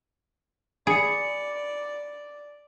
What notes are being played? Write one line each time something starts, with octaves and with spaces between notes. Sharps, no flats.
G#4 D5 B5 C#7